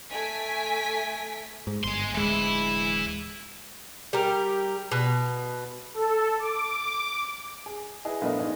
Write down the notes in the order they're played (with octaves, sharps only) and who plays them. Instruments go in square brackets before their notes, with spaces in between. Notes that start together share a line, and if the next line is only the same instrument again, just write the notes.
[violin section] A3 G#5 B6 D7
[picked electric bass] G#2
[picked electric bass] G1 [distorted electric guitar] G#3 C6
[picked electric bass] D1 G#3 [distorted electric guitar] E3 E4
[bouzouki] G3 G4 A#4
B2
[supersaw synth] A4
D6
[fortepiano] G#4
E4 G#4 B4 D#5
A#1 A3 B3 D#5
G#2 G#4 D#5